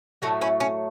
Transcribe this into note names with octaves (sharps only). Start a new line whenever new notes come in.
A2 F#3 A3 F#4 A4
C#4 E4
C#4